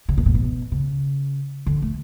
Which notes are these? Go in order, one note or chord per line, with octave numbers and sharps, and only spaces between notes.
C#3
B2
A2
B2
C#3
D3
A3